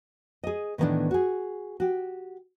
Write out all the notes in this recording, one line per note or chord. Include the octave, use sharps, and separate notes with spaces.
G#4 D#5
A2 D#3 E3 A#3 B3 D4
F#4 G#4
F#4 G4